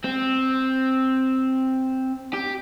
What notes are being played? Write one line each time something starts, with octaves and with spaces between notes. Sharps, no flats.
C4
G4